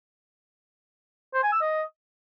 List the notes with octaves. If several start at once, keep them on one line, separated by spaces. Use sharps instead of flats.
C5
G#5
E6
D#5